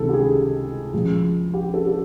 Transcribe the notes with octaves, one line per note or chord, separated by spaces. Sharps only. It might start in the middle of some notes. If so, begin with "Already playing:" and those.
Already playing: C#2 C3 D#3 A4
G4
G#4
C#2 C#3 F3
G4
A4
A4